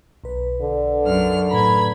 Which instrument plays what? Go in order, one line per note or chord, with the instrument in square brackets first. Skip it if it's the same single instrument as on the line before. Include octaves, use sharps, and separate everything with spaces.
[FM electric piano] B1 B4
[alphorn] D3
[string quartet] F#2 F6
[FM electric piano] A2 B4 A#5 [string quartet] B5 G#6